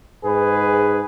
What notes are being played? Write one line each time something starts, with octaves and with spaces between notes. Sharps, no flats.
G#2 G#4 B4